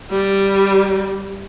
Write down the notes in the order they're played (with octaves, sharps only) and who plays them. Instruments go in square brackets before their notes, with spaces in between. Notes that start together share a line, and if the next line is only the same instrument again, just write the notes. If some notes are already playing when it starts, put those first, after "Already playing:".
[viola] G3